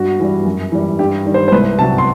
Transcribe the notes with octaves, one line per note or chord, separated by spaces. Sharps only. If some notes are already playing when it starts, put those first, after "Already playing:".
Already playing: G2 F#4
E3 G3
F#2
E3 G3
G2 G4
D#3 G3
C5
C5
C2 B4
C3 F#3 A5
C6